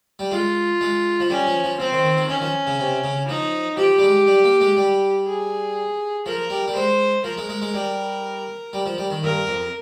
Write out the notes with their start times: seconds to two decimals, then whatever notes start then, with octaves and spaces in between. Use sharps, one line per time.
0.19 G3
0.31 G#3 F4
0.81 G#3
1.20 F3
1.30 G3 C#4
1.47 F3
1.64 F3
1.80 F3 C4
1.92 D#3
2.04 D#3
2.17 D#3
2.29 D#3 C#4
2.42 F3
2.67 C#3
2.79 C3
3.04 C#3
3.28 F3 D#4
3.77 F3 G4
3.98 G3
4.03 G#3
4.27 G3
4.44 A#3
4.60 G#3
4.77 G3
5.27 G#4
6.26 F3 A#4
6.50 G3
6.68 G3
6.75 G#3 C5
7.24 F3 A#4
7.37 G#3
7.49 G#3
7.62 G#3
7.74 G3
8.73 G3
8.86 F3
8.98 G3
9.10 D#3
9.23 G2 A#4
9.47 F2